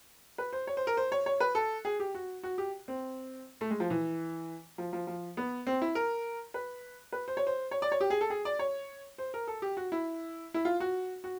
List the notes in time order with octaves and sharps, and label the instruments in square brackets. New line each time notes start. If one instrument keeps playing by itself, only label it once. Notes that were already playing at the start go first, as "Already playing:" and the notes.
[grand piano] B4
C5
C#5
C5
A#4
C5
C#5
C#5
B4
A4
G#4
G4
F#4
F#4
G4
C4
A3
G#3
F3
E3
F3
F3
F3
B3
C4
E4
A#4
B4
B4
C5
C#5
C5
C#5
D5
C#5
G4
G#4
A4
G#4
D5
C#5
C5
A#4
A4
G4
F#4
E4
E4
F4
F#4
F#4